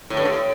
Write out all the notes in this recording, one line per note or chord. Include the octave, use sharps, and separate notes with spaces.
A2
G2
A2